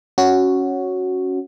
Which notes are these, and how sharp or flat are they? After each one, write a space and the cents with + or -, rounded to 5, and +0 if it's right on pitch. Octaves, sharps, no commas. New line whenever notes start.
C#4 +0 F#4 +0